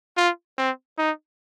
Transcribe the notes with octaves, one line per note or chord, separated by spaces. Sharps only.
F4
C4
D#4